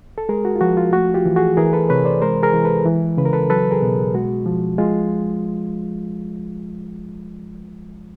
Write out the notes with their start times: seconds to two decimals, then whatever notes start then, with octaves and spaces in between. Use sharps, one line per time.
0.18 A4
0.29 G#3 G#4 A#4
0.45 F#4
0.56 F4
0.61 F3 F#4
0.77 F4
0.93 A3 F#4
1.14 F4 G4
1.25 E3
1.36 F#4 G#4
1.57 E3 G#4 A#4
1.73 A4 B4
1.89 C3 B4 C#5
2.05 C5 D5
2.22 G#3 A#4 C5
2.43 G#4 A#4
2.53 E3
2.64 A4 B4
2.85 E3
3.17 C#3 B4
3.25 A#4
3.33 A4 B4
3.50 F#3 A4 B4
3.71 G#4 A#4
3.82 B2
4.14 G#3 F#4
4.46 F3
4.78 G#3 F4